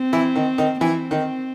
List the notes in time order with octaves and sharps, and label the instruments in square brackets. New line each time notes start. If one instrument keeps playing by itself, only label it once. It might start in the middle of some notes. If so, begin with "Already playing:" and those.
Already playing: [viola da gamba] C4
[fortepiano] E3 E4
D#3 D#4
D#3 D#4
[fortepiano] E3 E4 [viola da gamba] C4
[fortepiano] D#3 D#4